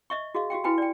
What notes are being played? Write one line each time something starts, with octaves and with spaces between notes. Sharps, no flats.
D#5 E5 C#6
F#4 G#4 D#5 F5
F#4 G4 F5 G5
E4 F#4 B4 G5 G#5 B5
D5 G5